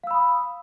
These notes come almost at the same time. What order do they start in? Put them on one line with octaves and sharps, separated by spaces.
F5 E6 B5 D#6